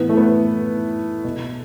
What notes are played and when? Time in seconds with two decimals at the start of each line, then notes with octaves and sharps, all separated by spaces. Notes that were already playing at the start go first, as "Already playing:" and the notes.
Already playing: A2 E3 B3
0.09 A3
0.17 B3
1.24 B2